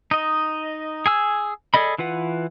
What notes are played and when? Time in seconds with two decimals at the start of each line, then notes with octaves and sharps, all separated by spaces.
0.11 D#4 D#5
1.06 G#4 G#5 E6
1.74 G#4 A4 D5 D#5 B5
1.98 E3 F4 B4 F#5